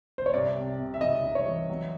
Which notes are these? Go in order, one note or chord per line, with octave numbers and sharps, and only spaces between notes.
C5
C#5
C2 D5
C3
C3
E5
C2 D#5
C2
C#5
E3
F#3